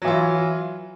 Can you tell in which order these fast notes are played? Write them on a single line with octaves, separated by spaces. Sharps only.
F#3 E3 F4